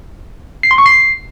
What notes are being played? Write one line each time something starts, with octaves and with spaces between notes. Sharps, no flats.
C7
C6
C#6
C7